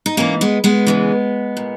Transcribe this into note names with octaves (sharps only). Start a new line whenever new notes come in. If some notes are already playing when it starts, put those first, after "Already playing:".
D#4
G#2 E3 A#3 C#4
G#3 B3
G#3 B3
E2 C#3 E3
A#2